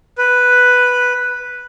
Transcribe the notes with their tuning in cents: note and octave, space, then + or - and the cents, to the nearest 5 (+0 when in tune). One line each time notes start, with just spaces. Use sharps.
B4 +0